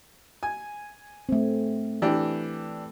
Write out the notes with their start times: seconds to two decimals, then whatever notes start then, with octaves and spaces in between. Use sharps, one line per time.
0.43 G#5
1.29 A3 C4
2.02 E3 D4 G4